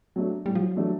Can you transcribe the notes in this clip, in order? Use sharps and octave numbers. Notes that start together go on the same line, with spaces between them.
F#3 A3 D4
A2 G3
F3
F#3
E3 F#3 A3 D4